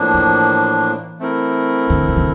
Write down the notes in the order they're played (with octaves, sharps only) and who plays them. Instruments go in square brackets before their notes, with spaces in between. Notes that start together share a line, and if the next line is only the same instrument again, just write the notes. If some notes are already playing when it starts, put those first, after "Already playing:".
Already playing: [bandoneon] A2 F3 A#3 D4
[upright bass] E3
[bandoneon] A3 C4 E4 A#4
[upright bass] D3
C3
D3